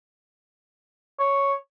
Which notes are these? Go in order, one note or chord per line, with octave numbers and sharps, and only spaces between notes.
C#5